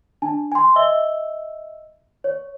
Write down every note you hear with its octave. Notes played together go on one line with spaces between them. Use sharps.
D4 G#5 A5
G#5 C6
D#5 E5 E6 G7
C#5